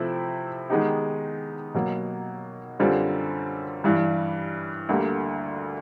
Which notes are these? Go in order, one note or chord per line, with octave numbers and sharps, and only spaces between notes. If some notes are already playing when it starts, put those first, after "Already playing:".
Already playing: C3 F3 A3 C4 E4
D#3 G#3 B3 D#4 G4
B2 F#3 A#3
F#2 D3 G3 C4 F4
G2 E3 G3
D2 D3 G3 A#3